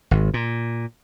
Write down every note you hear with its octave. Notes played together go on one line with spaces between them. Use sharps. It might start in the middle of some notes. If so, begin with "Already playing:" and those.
G#1
A#2